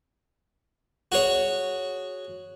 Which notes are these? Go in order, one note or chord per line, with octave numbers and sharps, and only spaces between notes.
F#4 G#4 C#5